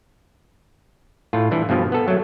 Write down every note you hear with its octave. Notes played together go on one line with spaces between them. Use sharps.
A2 F4
E3 G3 D4
G2 B2 F3
B3 A4
F#3 A3